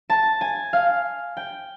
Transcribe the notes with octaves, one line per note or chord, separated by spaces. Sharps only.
A5
G#5
F5
G5